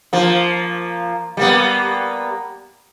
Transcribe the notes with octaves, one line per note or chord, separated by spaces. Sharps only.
F3 A#3
G3 A#3 B3